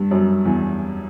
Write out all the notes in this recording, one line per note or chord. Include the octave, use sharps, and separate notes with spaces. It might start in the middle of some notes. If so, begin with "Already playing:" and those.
Already playing: G2 G3
F#2 F#3
E2 E3